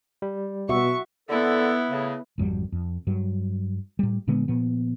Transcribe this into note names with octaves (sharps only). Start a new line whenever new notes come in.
G3
B2 F#4 E5 C#6
D3 B3 E4 A4
A2 C#3
G#1 F2 F#3 G3
F2
G2 F#3
A2 G3
A#2 D3 G#3 B3
A#2 F3 B3